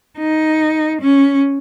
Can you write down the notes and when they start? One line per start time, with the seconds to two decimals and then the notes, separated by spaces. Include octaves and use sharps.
0.18 D#4
1.00 C#4